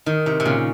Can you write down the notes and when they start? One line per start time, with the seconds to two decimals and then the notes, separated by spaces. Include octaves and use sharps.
0.06 D#3 D#4
0.26 C3 D#4
0.40 C3
0.45 A#2 C#3